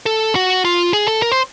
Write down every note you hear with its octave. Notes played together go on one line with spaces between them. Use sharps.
A4
F#4
F4
G#4
A4
A#4
C5